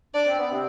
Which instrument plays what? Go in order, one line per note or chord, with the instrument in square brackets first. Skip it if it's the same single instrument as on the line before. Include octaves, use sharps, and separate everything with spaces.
[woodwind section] D4 [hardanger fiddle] D5
[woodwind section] C4
B3
C3 C4